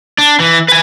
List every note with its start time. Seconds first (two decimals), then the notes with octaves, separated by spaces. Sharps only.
0.18 D4
0.40 E3
0.68 B4 G#5